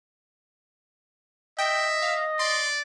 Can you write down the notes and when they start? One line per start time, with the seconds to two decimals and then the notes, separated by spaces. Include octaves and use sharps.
1.59 D#5 E5 G5
2.02 F5
2.39 D5 C6